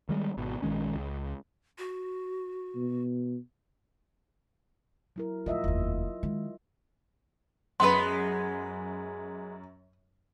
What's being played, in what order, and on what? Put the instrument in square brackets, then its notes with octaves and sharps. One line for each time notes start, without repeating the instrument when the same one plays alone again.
[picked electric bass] D#3 G3 G#3
G#1 B2
A#1 D#3 G#3 C#4
C#2
[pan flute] F#4
[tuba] B2
[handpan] F#3 E4 A#4
[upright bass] A2 F3 [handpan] F4 D#5 E5
[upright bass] F1 D#2
D#3 G#3
[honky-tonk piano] F#2 [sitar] G#3 B3 [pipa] B4 F#5 [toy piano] C6